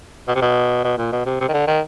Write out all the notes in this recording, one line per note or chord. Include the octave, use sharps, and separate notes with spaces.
B2
C3
B2
B2
A#2
B2
C3
C3
D#3
D3
D#3